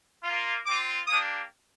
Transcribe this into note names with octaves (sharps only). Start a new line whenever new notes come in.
A#3 F4
C4 F4 D6
A#3 D4 G4 D#6